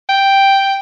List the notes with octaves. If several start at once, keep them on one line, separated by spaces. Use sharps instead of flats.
G5